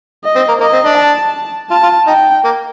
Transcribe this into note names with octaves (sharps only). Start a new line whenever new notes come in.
D#5
C4
A#3
A#3 D#5
C4
D4
A5
F4 A5
F4
D#4 G5
A#3